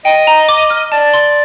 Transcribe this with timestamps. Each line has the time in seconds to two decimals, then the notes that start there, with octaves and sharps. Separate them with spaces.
0.05 D#5 G5
0.27 A#5
0.49 D6
0.70 F6
0.92 D5 A5
1.14 C6